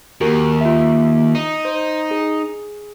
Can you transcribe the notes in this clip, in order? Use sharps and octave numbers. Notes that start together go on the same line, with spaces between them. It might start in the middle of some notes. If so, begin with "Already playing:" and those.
D#2 F#4 G4 A#4
F4 E5
D#4
C5
G#4